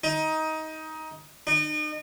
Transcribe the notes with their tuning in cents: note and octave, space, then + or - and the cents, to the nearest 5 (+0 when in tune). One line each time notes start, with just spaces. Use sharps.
D#4 +20
D#4 -35